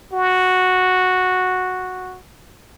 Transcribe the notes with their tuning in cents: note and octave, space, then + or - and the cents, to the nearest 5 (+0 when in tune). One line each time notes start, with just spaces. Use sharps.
F#4 -5